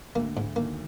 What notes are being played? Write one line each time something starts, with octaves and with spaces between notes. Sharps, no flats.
D2 D3 A#3
G#2
D#2 D#3 A#3